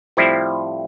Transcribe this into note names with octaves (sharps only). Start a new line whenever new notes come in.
A2 F3 G3 C4 E4 F4